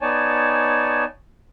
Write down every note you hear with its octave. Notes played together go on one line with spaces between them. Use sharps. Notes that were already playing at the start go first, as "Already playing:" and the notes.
B3 D#4 C#5 D5 G#5 A5